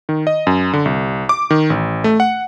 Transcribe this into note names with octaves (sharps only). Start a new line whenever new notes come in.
D#3
D#5
F#2
D3
C2
D6
D#3
A1
A3
F#5